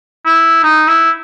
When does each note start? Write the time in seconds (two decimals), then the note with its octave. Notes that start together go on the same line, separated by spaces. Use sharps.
0.25 E4
0.63 D#4
0.88 E4